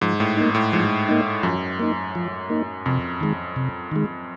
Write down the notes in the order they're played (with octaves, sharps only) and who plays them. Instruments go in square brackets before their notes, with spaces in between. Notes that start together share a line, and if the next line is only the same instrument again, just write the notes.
[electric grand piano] G#2 [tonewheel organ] F3
[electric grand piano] A2
[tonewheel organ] A#3 D#4
[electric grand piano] A2
[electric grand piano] G#2 [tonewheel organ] F3
[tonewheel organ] A#3 D#4
[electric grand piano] F#2 [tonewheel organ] F3
[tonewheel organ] A#3 D#4
F3
A#3 D#4
[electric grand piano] F2 [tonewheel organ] C3
[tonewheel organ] D#3 G#3
C3
D#3 G#3